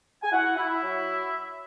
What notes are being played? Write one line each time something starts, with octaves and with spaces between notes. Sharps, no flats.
G#5
E4 F#4 F#5
E4
E4 E5
F#3